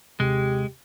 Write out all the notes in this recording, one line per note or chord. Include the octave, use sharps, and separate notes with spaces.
D#2 C3 G#3 G4